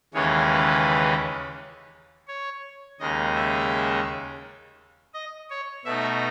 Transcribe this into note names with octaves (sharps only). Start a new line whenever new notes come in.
D#2 C#3 E3 G#3 C#4 C#5
B4
C#5
D#2 C#3 G#3 D#4 D#5
E5
D#5
C#5
B2 A3 D#4 E5